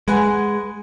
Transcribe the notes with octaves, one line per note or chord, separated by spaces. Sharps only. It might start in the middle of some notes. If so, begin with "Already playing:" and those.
G#3 B4 F#5 G#5